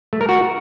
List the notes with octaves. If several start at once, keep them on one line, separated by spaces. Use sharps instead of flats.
A3
A#4
F#4